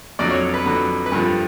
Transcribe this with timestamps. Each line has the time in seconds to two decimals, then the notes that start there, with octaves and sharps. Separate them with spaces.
0.19 F2 D3 F#3 D5
0.31 C#5
0.54 B4
0.65 F2 D3 F#3
1.06 B4
1.12 G2 D3 F3 A#4